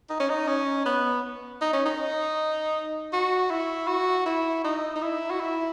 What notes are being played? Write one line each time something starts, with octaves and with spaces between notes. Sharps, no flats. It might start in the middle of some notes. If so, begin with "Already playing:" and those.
D#4
C#4
D#4
C#4
B3
D#4
C#4
D#4
F#4
E4
F#4
E4
D#4
D#4
E4
F#4
E4